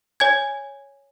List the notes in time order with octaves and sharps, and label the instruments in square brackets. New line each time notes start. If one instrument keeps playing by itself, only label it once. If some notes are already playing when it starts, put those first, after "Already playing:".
[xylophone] C#5 G#5 G#6